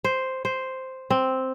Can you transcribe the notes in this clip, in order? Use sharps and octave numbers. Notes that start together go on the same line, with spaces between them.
C5
C5
C4